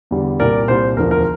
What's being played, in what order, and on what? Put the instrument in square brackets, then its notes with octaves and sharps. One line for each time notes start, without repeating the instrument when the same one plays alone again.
[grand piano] E2 D3 G3
C2 A#2 G3 A#4 D5
C2 A#2 G3 C5
E1 D2 D3 F3 A#4
A#4